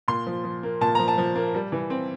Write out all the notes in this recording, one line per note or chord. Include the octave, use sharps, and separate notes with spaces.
A#2 C6
F3
F3
A#3
A#2 A5
F3 A#5
A5
F3
A#3
G3
E3
C4